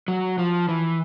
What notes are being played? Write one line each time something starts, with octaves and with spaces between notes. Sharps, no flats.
F#3
F3
E3